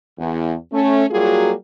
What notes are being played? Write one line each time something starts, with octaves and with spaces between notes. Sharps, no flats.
E2
A3 C#4
F#3 G3 A#3 F4 F#4 G#4